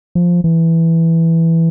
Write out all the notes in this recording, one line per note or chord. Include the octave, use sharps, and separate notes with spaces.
F3
E3